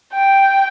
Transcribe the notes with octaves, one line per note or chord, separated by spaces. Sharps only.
G5